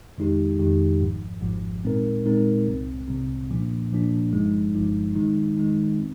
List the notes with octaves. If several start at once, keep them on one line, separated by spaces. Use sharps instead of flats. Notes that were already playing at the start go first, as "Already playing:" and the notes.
F2 D#3 G#3 D#4 G4
F2 D#3 G#3 D#4 G4
G#1 G#2 F3
G#1 G#2 F3
A#2 G#3 C4 D#4 A#4
A#2 G#3 C4 D#4 A#4
C2 C3 G3 C4
C2 C3 G3 C4
A#2 F3 A#3 D4
A#2 F3 A#3 D4
G1 G2 F3 G#3 D#4
G1 G2 F3 G#3 D#4
D#3 G#3 D#4
D#3 G#3 D#4
C4